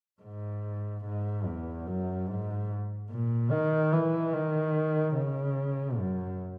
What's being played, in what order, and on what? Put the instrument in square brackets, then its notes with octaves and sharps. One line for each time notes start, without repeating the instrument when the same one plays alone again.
[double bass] G#2
G#2
E2
F#2
G#2
A#2
D#3
E3
D#3
C#3
F#2